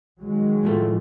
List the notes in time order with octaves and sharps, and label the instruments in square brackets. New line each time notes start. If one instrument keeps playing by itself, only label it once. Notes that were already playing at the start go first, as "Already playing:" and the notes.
[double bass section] D#3 F#3 G#3
[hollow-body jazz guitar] A2 F3 A3